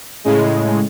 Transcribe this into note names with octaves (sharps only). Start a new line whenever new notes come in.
A2 C#3 G#3